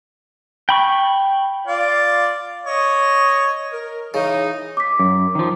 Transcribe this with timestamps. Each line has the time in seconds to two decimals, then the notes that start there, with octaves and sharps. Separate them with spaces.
0.69 G5 B5 C#6
1.67 F4 D5 F5
2.66 C#5 D#5
3.73 A#4
4.14 C#3 E3 D#4
4.77 D6 B6
4.99 F#2
5.35 D#3 F3